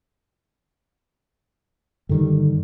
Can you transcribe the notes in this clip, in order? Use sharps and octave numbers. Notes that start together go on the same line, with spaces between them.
G2 D3 D#3 G3